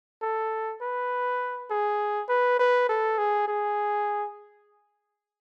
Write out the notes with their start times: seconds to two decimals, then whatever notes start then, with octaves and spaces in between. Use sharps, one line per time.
0.22 A4
0.81 B4
1.71 G#4
2.29 B4
2.59 B4
2.89 A4
3.18 G#4
3.48 G#4